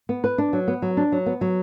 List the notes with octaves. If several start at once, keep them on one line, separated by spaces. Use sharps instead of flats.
B3
B4
D4
F#3
B3
F#3
D4
F#3
B3
F#3